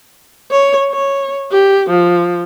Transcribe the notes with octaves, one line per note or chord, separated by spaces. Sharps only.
C#5
C#5
G4
F3